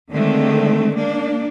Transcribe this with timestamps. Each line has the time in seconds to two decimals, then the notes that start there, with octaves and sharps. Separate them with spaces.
0.11 D3 D#3 G#3 A3 C4
0.95 A#3 D4